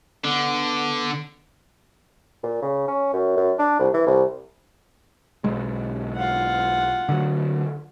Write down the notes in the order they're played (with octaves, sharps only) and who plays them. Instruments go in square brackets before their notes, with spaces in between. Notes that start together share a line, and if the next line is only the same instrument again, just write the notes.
[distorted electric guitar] D3 [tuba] B3
[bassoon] A#2
C#3
C#4
F#2
F#2
D4
C2
E3
C2
[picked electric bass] B1 G#3
[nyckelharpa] F4 F#5
[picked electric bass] D3 F#3